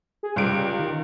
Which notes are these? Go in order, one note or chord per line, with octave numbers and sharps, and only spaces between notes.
G#4
C#2 G3 D7
D#3